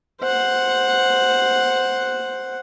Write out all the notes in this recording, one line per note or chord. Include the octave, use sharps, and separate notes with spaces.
C5 F#5